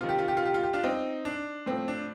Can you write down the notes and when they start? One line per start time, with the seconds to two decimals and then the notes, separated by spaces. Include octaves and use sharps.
0.01 C3 D#3 F4
0.09 G4
0.18 F4
0.28 G4
0.37 F4
0.45 G4
0.54 F4
0.63 G4
0.73 D4 F4
0.84 C4 D#4
1.25 D4
1.66 A2 F3 C4
1.88 D4